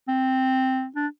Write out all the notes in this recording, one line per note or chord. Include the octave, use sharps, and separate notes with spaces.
C4
D4